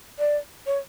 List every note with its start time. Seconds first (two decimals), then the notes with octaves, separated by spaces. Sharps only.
0.19 D5
0.66 C#5